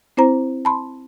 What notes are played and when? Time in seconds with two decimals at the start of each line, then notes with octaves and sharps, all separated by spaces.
0.17 C4 E4 C5 A#5
0.65 A5 B5 C6